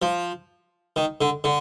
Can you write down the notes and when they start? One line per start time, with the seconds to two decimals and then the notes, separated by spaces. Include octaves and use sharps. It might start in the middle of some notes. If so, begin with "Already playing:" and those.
0.02 F3
0.96 D#3
1.21 D3
1.44 D3